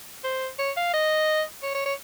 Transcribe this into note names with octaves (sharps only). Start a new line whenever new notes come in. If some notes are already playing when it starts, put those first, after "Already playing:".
C5
C#5
F5
D#5
C#5
C#5
C#5